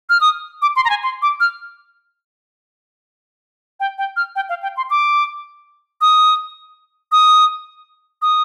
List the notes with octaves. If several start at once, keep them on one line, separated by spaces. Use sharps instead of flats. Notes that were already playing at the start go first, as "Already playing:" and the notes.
F6
D#6
D6
C6
A#5
G#5
C6
D6
F6
G5
G5
F6
G5
F5
G5
C6
D6
D#6
D#6
D#6